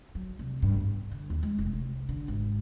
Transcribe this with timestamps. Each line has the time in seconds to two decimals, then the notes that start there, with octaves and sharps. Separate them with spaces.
0.15 F#3
0.39 C2
0.62 G2
0.80 B3
1.11 D3
1.30 D#2
1.43 G#3
1.58 F1
1.73 C2
2.09 D3
2.28 G#1